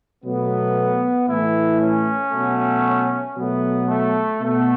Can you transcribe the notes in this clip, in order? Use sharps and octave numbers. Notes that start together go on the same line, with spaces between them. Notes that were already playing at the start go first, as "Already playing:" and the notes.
B2 F#3 A3 B3
A2 E3 A3 E4
C#4
B2 F#3 A3
B2 F#3 A3 B3
A3
B2 A3